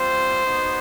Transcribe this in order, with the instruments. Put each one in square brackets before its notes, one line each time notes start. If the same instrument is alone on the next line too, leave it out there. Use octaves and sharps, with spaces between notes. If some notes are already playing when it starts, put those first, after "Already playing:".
Already playing: [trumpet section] G3 C4 F4 C5
B3 D#4 F#4